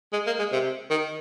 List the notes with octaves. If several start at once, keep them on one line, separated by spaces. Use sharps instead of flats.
G#3
A#3
G#3
C3
D#3